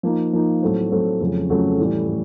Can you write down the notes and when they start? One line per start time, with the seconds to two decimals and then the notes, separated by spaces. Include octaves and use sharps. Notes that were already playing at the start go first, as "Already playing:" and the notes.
0.03 F3 A#3 D#4
0.33 F3 A#3 D#4
0.62 A2 F#3 A3 C4
0.91 A2 F#3 A3 C4
1.20 F2 C#3 F#3 A3 C#4
1.50 F2 C#3 F#3 A3 C#4
1.79 A2 E3 G3
2.08 A2